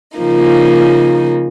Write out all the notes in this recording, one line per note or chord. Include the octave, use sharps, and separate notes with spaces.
C#3 F3 A#3 D#4